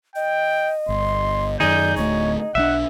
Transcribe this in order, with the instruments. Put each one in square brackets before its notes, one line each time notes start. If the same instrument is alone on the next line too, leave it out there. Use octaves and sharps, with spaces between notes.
[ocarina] D#5 [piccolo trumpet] G5
[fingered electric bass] G1 [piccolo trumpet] C6
[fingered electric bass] F#2 D#3 [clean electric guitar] D#4 G#4 [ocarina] D5 [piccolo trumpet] G6
[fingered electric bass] D1 D2 A3 [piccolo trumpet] C#5 [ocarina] D#5
[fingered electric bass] B1 F#3 D4 [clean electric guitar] E5 [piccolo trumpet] F#5